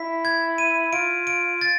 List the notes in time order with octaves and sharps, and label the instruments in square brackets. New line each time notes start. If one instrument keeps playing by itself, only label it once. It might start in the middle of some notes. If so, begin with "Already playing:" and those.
Already playing: [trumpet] E4 [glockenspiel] B6
[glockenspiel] G#6
D#7
[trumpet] F4 [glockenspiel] D7
[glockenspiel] D7
A6